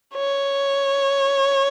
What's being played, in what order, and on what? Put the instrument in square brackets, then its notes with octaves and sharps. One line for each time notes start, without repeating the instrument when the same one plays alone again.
[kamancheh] C#5